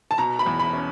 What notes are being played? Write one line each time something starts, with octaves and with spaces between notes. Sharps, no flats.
A5
B2 A#5
B5
E2
B5
C#4